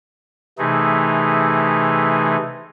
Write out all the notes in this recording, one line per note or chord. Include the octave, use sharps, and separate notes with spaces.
C3 E3 A3 D#4 G#4